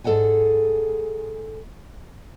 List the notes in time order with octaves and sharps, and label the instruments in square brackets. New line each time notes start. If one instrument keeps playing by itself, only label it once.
[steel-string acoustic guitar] G#2 G#4 A4 D5 F#5 G#5